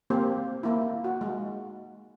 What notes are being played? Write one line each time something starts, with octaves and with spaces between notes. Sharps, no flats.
A#3 C4 G4
A#3 E4
F#4
G#3